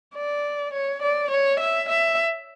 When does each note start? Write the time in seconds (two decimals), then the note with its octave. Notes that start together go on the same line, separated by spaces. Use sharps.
0.15 D5
0.73 C#5
1.02 D5
1.31 C#5
1.60 E5
1.89 E5